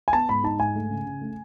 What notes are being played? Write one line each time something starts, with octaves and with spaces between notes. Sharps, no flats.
G#5
B3 A5
G#2 B5
D#4 A5
G#2 G#5
A3
C#3
C#3
A3